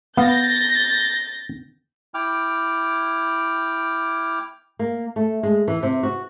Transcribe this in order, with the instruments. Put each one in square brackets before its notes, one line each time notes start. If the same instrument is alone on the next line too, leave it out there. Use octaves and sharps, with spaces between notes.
[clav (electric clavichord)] B3 F5 [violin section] G6 A6 A#6
[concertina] E4 G5 D6 F6
[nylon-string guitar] A#3
A3
G#3
E3
C3
F#4